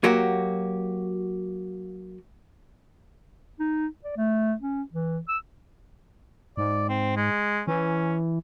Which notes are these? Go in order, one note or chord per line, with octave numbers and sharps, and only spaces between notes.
F#3 A#3 F#4 G4
D#4
D5
A3
C#4
E3
E6
G#2 D5
C4
G#3
E3 C#4